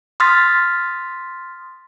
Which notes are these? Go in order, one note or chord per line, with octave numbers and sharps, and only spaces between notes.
C6 D#6 F6 A6 B6